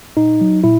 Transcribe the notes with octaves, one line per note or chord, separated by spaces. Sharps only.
A#2 D#4
F#3
A#2 E4